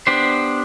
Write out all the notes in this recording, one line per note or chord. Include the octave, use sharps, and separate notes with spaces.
B3 D4 G4 C5